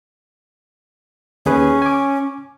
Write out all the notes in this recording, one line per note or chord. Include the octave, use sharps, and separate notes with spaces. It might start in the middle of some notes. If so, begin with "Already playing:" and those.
D#2 C#4 G#4 B4
G#5 D6